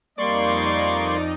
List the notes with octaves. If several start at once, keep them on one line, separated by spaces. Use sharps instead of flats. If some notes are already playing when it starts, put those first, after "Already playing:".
F2 G3 A#3 D#4 D5 C6 C#6